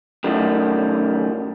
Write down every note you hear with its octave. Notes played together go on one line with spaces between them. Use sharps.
F#2 A2 D#3 G3